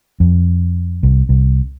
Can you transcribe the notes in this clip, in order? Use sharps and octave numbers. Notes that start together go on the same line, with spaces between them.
F2
C2
C2